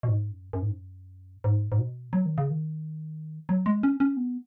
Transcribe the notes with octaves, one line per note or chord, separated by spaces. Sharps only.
B2
G#2
F#2
F#2
G#2
F#2
G#2
G#2
B2
F#3
D#3
C#3
D#3
F#3
G#3
C#4
C#4
B3